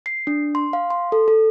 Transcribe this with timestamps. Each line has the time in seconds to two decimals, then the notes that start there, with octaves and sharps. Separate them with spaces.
0.06 C7
0.27 D4
0.55 C6
0.73 F5
0.90 C6
1.12 A4
1.28 A4